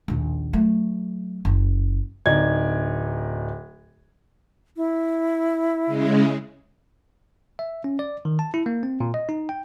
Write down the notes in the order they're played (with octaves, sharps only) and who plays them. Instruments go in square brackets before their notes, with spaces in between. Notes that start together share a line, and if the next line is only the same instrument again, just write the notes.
[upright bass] A#1 D#2
F#3 A3
F#1
[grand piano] D1 D#4 D5 G#6
[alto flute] E4
[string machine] C#3 G#3
[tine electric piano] E5
C#4
D5
D#3
A5
E4
A#3
C4
A#2
D#5
D#4
G5